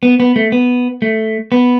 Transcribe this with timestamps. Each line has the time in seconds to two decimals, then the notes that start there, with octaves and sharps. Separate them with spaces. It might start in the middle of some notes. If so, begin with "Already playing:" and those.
0.03 B3
0.20 B3
0.36 A3
0.52 B3
1.02 A3
1.52 B3